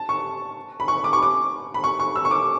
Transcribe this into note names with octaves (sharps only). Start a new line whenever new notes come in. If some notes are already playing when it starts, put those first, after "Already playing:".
Already playing: A5
C#6
B5
C#6
D6
C#6
D6
B5
C#6
C#6
E6
C#6
D6